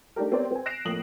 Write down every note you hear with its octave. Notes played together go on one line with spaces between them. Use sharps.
A3 D4 D#4 G4 A#4
B3 C4 G4 A#4 C#5 D5
C4 G#5
F#6 A#6 C7 D7 E7 F7
F2 A2 A#3 D#6 F#7